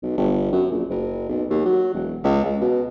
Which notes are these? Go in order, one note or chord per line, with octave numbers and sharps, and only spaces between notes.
B1
G1
F#2
A#1
F#1
B1
D#2
F#3
E1
C#2
C#2
B2